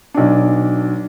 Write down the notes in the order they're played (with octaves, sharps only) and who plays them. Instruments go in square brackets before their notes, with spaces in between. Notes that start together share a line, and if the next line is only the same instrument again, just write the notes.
[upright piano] B1 D4